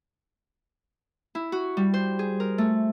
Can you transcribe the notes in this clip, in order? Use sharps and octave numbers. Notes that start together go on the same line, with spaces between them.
E4
F#4
G3
C5
G#4
A#4
A3